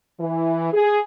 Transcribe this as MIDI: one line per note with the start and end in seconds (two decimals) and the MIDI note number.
0.19 0.71 52
0.72 0.99 68